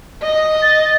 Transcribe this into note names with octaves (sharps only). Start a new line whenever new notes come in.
D#5
A6